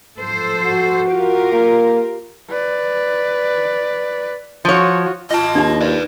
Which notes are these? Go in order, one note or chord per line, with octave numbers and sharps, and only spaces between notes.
F3 A4 C5
F#4
F4 G4 A#4
A#3
B4 D5
F3 F4 F#4 C#5
F4 D#5 A5
D#2 D4 D#4
B4 D5